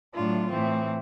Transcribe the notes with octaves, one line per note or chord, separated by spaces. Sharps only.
A2 F#3 A3 D4 F4
A2 E3 A3 C4